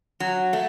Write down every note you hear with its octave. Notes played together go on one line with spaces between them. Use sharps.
F#3
A3